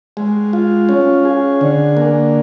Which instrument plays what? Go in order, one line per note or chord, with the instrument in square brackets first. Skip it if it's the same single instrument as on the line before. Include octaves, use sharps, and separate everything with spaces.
[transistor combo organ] G#3
F4
C#4
G#4
D3
A#3